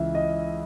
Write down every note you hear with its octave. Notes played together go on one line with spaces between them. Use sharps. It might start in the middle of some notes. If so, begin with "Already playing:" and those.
Already playing: C#2 C#3 E3 E5
D#5